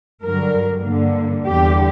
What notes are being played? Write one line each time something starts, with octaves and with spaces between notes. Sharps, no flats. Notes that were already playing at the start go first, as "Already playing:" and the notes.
G2 D3 F#3 A#4
G2 D3 A#3
E2 D3 G3 G4